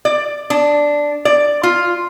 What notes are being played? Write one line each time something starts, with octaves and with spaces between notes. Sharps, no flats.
D5
D4
D5
F4